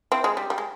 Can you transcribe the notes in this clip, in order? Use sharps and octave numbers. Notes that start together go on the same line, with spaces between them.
C4 E4
G#3
G3
G3
G#3